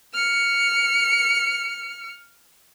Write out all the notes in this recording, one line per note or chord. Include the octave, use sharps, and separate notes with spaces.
F6 C#7